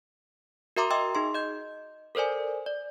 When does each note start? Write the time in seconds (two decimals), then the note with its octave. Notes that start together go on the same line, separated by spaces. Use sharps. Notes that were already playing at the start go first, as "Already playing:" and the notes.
0.76 F#4 A#4 E5 A#5 C6 D6
0.90 D#5 E5 G5 C6 D6 E6
1.15 D#4 G#4 C6
1.34 D#5 G6
2.15 A4 A#4 C5 D5 G#5
2.66 D5